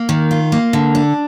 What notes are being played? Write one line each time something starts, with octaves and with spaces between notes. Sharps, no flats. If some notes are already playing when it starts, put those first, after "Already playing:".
Already playing: A#3
D#3
F4
A#3
D3
D4